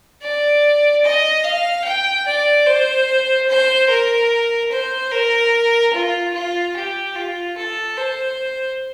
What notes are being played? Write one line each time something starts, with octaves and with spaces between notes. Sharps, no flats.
D5
D#5
F5
G5
D5
C5
C5
A#4
C5
A#4
F4
F4
G4
F4
A4
C5